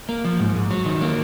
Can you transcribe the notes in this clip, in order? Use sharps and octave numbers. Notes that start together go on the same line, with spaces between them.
A#3
F3
G#2
G#2
F#3
D#3
A#3